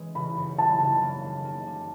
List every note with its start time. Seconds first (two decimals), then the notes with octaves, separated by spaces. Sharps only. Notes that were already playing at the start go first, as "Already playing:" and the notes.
Already playing: E3 G#3 C#4
0.15 C#3 B5
0.37 F#2
0.58 F#3 A5
0.79 C#3
1.02 A#3
1.23 D#3
1.44 A#3
1.67 G3